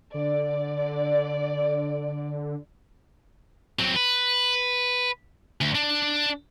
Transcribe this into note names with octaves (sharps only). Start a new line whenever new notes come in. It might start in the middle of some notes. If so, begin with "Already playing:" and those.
D3 D5
F#3 C4
B4
D2
D4